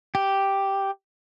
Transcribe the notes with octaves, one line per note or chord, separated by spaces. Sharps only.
G4